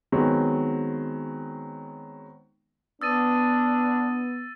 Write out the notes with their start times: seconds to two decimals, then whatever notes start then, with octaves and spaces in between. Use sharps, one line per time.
0.12 D#3 F#3 G#3 B3 C4
3.02 B3 D4 D#6 E6 A6 D#7